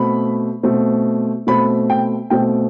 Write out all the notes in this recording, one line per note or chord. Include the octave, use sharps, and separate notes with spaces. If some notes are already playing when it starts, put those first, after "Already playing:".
Already playing: B2 A3 C4 B5
B2 A3 C4
B2 A3 C4 B5
G5
B2 A3 C4 G5